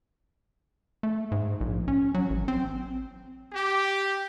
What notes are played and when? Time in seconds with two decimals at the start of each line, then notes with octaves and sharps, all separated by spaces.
1.03 A3
1.32 G#2
1.61 A#1
1.88 C#4
2.14 F#3
2.30 A1
2.48 C4
3.52 G4